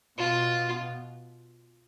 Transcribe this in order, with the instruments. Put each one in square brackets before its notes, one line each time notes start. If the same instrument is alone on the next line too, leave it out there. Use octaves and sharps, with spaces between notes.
[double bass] B2 [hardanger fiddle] F4